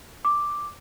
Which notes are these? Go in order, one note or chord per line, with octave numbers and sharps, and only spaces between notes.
D6